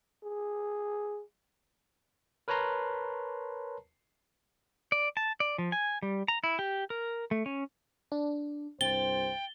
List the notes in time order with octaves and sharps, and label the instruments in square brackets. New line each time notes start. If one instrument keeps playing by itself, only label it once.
[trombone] G#4
[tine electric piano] A#4 B4 C#5 A5 A#5 C6
[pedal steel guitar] D5
A5
D5
F3
G#5
G3
A#5
E4
G4
A#4
A3
C#4
[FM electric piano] D4
[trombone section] C2 G2 C5 [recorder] G5 [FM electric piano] A6 [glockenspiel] G7